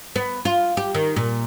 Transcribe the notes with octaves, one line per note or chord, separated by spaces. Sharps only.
B3
F4
G4
D#3
A#2